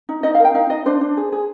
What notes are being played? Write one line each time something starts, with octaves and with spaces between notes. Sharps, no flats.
D#4
D#4 D#5
F5
A#4 G5
D#4 F5
D#4 D#5
D4 C5
D4
G#4
G#4